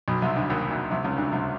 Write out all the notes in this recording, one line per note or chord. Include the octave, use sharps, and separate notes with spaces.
B1 B2
C2 C3
D2 D3
D#2 D#3
D2 D3
C2 C3
C#2 C#3
D2 D3
C2 C3